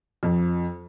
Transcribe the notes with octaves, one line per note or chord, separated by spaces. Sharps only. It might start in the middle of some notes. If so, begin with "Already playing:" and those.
F2